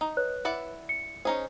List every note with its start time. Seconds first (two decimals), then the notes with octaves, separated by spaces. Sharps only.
0.01 D#4
0.17 B4 C#5 F#6
0.45 E4 D5 F#5
0.89 C#7
1.25 C#4 D#4 G#4 C5